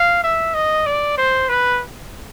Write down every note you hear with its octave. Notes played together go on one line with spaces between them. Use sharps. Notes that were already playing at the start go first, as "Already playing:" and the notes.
Already playing: F5
E5
D#5
D5
C5
B4